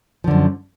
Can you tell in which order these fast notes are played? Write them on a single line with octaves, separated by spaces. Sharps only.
F3 D3 F#2